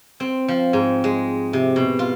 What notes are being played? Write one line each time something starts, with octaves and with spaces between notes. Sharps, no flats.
C4
F3
G#2
G#3
C3
B2
F4